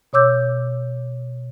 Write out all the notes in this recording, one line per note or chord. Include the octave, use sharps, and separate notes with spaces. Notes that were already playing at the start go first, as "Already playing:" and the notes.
B2 C#5 D6 E6 G6